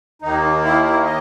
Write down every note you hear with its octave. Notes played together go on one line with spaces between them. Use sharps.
D#2 D#3 A#3 D#4
E4
E4
D#5